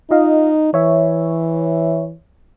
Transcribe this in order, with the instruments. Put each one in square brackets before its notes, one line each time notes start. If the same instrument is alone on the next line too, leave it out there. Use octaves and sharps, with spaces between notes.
[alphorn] D#4 [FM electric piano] F4 D#5 F5
[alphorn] E3 [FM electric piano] C#5 E5